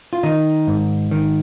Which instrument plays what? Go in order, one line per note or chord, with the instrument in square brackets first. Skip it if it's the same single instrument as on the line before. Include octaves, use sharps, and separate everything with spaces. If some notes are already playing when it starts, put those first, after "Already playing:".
[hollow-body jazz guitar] F4
D#3 D#4
G#2
D#3